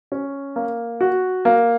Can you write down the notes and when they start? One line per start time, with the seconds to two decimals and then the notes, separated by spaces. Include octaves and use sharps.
0.12 C#4
0.56 A#3
1.01 F#4
1.45 A#3